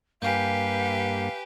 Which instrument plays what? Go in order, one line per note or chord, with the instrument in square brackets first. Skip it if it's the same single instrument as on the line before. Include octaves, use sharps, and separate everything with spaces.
[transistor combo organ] G2 A#3 [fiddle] G4 B4 [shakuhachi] F5 [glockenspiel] G#5 G6